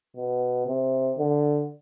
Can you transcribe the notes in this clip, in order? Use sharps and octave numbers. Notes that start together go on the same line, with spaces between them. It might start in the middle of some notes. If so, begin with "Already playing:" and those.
B2
C3
D3